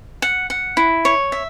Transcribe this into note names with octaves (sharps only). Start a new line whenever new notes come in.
F#5
F#5
E4
C#5
E5